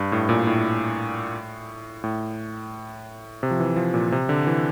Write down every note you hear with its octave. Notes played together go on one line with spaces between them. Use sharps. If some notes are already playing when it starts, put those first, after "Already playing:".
Already playing: G2
A2
A#2
A2
A2
C3
F3
E3
F3
A#2
C3
D3
E3